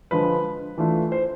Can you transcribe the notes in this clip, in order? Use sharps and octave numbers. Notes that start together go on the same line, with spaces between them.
D3 F3 G#3 B4
E3 A3 D4 F4
C5